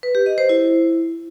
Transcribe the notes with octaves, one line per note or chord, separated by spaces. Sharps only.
B4
G4
D#5
C5
E4